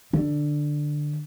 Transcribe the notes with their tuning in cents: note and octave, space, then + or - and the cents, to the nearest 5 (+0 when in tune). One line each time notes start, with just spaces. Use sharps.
D3 +10